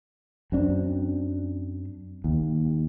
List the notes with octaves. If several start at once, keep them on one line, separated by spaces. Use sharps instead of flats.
F#2 C4 D4
D#2